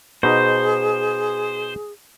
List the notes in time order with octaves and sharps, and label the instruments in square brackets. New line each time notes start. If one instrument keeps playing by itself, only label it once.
[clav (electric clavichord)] B2 D#4 [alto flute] G#4 [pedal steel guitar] C5